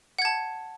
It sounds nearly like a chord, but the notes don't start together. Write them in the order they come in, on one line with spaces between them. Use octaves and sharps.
F#5 G#6 A5